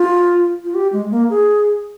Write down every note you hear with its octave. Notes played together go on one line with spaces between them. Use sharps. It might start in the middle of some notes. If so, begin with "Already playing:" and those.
Already playing: F4
F4
G4
G#3
A#3
G#4